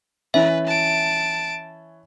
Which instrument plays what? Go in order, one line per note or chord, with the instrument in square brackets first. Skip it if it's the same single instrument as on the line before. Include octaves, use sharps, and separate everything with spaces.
[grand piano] E3 C#4 [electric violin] B4 [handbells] E5
[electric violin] A5 D7